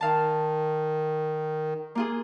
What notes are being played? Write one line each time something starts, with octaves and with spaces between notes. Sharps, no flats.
D#3 F5 A5
A#3 F4 G#4